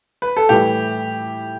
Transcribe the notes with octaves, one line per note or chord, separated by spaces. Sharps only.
B4
A4
A2 E3 G3 G4